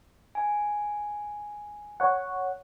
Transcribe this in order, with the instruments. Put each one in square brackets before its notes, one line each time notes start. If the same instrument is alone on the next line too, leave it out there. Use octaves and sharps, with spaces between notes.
[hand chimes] G#5
[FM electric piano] C#5 F#5